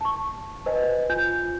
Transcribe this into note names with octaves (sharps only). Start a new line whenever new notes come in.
A5 C#6
B4 C5 D#5 G#5
F4 G#5 G6